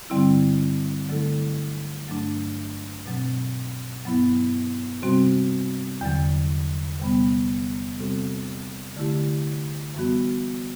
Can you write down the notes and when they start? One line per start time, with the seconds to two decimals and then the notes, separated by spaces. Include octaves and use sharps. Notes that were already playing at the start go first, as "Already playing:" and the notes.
0.10 G2 D3 G3 C4 E4
1.09 D3 F#3 A3 E4 A4
2.07 G2 F#3 A3 D4
3.06 B2 F#3 C4
4.04 G2 F#3 B3 E4
5.02 C3 G3 C4 F#4
6.01 E2 D3 F#3
7.00 C3 G3 B3
7.98 C3 G3 C4 F#4 A4
8.96 D3 A3 E4 G4
9.95 F#2 E3 G3 B3 F#4